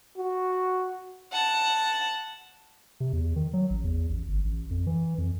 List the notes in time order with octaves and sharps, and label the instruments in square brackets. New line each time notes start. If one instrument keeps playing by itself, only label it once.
[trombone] F#4
[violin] F#5 A5
[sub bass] C3
E2
D#3
F#3
A1
E2
A1
G1
A1
F2
E3
F2